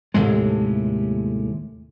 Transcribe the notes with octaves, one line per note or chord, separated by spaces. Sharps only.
D#2 A2 C3 G#3